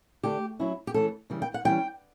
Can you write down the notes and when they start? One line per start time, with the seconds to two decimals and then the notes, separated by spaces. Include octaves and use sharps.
0.23 D3 A3 D4 G4
0.59 F#3 C#4 E4
0.87 G4
0.94 E3 A3 C#4 A4
1.30 C#3 E3 G3
1.42 G5
1.54 F#5
1.65 E3 G3 C#4 G5